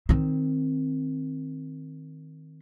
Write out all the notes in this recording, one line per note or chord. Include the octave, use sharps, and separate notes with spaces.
D#3 C4